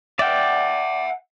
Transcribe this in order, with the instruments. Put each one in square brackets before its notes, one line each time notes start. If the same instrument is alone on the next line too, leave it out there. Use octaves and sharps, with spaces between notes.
[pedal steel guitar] D5 G5 [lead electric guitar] E5 F#5